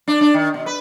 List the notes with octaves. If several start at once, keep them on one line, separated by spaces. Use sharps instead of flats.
D4
D4
D#3
B2
B4